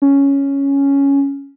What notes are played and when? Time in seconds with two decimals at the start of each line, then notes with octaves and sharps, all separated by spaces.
0.02 C#4